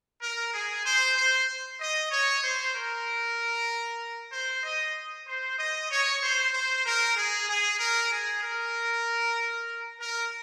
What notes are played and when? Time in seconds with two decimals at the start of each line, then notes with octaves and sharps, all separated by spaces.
0.22 A#4
0.53 G#4
0.85 C5
1.17 C5
1.80 D#5
2.11 C#5
2.43 C5
2.74 A#4
4.32 C5
4.63 D#5
5.27 C5
5.58 D#5
5.90 C#5
6.21 C5
6.53 C5
6.84 A#4
7.16 G#4
7.47 G#4
7.79 A#4
8.10 G#4
8.42 A#4
10.00 A#4